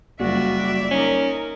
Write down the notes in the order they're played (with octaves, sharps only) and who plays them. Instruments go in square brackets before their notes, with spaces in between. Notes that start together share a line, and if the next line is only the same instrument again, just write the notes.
[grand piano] F#1 [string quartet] G3 D5 E5 [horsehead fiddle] F4 F#4
[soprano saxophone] C#4 [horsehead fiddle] D#4 A#4